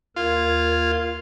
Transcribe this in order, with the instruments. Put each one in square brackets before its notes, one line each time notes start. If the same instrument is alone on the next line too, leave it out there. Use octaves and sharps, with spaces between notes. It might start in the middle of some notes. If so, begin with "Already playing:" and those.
[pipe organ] D#2 A#4 G#6 [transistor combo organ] F4